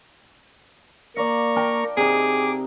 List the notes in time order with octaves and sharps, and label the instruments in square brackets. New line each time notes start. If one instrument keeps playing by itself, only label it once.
[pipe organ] A#3 A#5 C#6 [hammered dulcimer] D5 F5
[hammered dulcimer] A#4 G5 A5
[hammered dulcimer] C3 D#4 [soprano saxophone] G#4 [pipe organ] D6